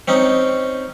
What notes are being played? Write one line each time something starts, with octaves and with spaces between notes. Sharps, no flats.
C4 C#4 D#4